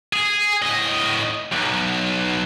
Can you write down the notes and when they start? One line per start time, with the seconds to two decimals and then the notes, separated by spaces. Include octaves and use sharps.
0.13 G#4
0.62 A2 D#5
1.52 B1